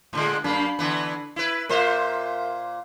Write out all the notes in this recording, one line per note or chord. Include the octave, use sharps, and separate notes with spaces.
A2 D3 G#3
F#2 A#3 D4 B5 C7
D3 E3 B3
E4 B4
A#2 F4 A#4 C5 E5